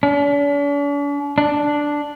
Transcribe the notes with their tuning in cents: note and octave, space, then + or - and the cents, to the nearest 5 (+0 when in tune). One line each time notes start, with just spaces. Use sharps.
D4 -45
D4 +0